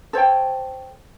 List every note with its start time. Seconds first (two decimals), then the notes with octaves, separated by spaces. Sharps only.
0.13 A4 C5 C#5 G5